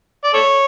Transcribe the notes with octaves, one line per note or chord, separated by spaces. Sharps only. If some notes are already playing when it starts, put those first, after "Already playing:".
D5
A4 C#5